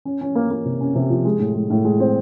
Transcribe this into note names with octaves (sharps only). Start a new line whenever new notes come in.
C#4
C#4
A#3
A#3
C3
C#4
C3
F3
G#3
A2
G#3
A2
G#3
C4